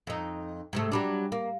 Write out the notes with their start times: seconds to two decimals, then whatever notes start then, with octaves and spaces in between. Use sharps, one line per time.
0.07 F2 D#4
0.73 G#2 C3 A3
0.92 F#3 G3 D4
1.32 A#3